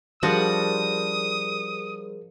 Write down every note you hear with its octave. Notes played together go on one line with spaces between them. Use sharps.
F3 G3 D4 F#4 G#4 A#4 C5 D#6